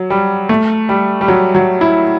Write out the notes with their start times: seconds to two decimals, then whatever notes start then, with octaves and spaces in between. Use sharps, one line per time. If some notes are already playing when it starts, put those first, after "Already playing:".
Already playing: F#3
0.10 G3
0.49 A3
0.89 G3
1.21 G3
1.28 F#3
1.55 F#3
1.81 E4